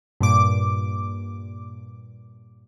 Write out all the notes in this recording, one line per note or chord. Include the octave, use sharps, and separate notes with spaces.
G2 A#2 D6